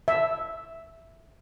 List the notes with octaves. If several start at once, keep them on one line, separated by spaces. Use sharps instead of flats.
E5